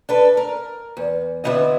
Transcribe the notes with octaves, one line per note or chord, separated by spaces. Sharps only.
D4 A4 B4
A#4
E2
D3 B3 E4 F#4 D#5